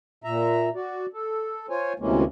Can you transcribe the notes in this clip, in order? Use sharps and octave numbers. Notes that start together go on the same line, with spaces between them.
A#2 E5 A#5
F#4 D5
A4
F4 C5 C#5 G#5
D2 C3 E3 G#3 A#3 C#4